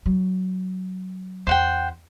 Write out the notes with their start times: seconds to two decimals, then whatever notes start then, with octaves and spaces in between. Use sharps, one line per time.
0.06 F#3
1.47 E2 C5 F#5 G5